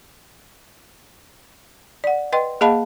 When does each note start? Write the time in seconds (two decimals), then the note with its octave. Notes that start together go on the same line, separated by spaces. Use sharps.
2.04 D5 F#5
2.32 B4 D#5 G5 C6
2.61 A#3 G#4 D#5 F5 A5 B5